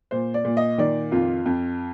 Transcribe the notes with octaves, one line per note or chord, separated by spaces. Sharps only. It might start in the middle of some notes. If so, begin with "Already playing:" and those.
A#2 C5
D5
A#2
D#5
D#3 D5
F2 F4
F2